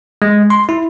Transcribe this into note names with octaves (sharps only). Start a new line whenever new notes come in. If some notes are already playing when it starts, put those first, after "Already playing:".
G#3
C6
E4